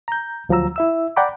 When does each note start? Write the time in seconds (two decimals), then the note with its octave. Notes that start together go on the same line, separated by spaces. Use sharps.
0.08 A#5 G6
0.49 D2 F3 F#3 A#5 E6
0.76 E4 E5 E6
1.16 D5 F#5 G5 A#5 B5 D6